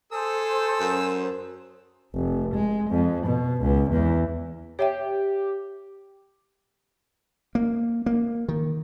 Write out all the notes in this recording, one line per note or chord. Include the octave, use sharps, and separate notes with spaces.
G#4 A4 C5 E6
F#2
F1
G#3
F2
B2
C#2
E2
G4 C#5 E5 G5
A#3
A#3
D#3